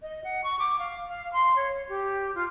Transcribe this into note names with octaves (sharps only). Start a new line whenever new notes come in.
D#5
F#5
C#6
D6
F5
F5
C6
C#5
G4
F4